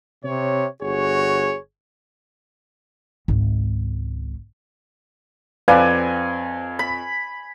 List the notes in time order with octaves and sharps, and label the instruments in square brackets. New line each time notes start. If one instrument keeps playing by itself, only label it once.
[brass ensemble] C3 C#5
G1 F#4 G#4 C#5
[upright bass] G#1 C#2
[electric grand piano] F2 C4 [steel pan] B4 D5 [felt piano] F5 [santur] G#5
[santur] B5